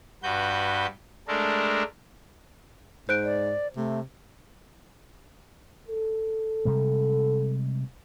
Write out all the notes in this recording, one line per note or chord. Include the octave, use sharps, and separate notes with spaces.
G2 F#4 B4 G6
G#3 A3 D4 A4 A#4
G#2 C5 F#6 D7
D5
C3 A3
A4
C3 G3 G#3